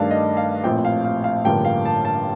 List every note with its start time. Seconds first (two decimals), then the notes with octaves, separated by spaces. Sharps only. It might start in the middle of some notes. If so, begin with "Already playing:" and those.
Already playing: G2 D#3 A3 D4 F5
0.11 D#5
0.37 F5
0.64 A#1 A2 F3 C4 G5
0.85 F5
1.05 F5
1.24 F5
1.44 A1 G2 D3 F3 A#3 G5
1.65 F5
1.85 A5
2.05 A5